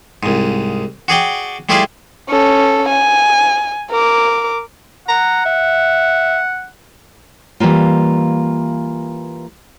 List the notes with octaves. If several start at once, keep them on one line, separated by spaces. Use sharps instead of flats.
C2 G#2
F#4 G#4 D5 G5
G3 A3 E4 F4 G#4 D5
C#4 A4
G#5
A#4 D6
F#5 A#5
E5
E3 G3 A3 A#3 F4